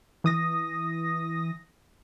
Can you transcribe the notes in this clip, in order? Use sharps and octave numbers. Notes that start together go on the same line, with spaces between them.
E3 D#6 A#6